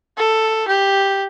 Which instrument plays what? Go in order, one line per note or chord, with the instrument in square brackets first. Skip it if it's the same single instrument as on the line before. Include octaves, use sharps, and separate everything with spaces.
[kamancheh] A4
G4